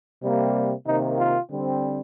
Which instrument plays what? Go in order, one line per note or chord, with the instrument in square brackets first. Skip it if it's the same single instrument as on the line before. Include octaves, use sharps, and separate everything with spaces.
[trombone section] C3 G3 A#3
C3 D#3 A#3 D#4
F4
D3 G3 C4